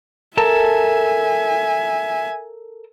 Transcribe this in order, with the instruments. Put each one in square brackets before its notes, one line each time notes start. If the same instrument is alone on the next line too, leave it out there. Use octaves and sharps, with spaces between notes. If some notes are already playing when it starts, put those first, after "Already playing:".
[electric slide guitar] A4 A#4 A5 [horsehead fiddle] E5 G#5